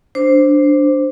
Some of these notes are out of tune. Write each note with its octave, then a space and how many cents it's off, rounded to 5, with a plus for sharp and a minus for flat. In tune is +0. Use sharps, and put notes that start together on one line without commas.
D4 +0 C5 +0